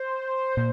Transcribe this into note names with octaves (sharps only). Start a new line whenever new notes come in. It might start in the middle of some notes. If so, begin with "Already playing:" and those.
Already playing: C5
A#2